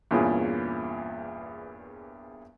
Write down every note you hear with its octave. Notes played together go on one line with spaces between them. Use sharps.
E2 G2 A#2 C#4 F4 G#4